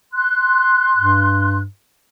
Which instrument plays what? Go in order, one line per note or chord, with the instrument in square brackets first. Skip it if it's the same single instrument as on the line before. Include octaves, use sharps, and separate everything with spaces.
[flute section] C6 F#6
[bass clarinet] G2